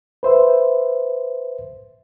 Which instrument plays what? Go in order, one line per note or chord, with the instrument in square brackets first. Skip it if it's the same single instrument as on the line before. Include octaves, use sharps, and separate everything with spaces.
[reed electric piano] B4 C5 E5